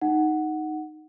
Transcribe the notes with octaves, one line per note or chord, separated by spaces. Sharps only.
D#4 F#5